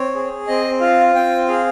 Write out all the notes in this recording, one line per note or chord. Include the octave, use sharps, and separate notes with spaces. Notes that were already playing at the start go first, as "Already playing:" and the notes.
Already playing: C4 C#5
G#4
C4 D#5
F4 F5
C4 G5
G#4 F5